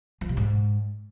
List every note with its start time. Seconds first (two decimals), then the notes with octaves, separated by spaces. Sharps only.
0.21 F3
0.29 C3
0.37 G#2